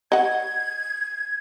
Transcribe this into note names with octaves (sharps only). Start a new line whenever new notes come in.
D#5 F#5 G#6